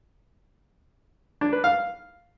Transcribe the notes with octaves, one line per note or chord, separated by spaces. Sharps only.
D4
B4
F5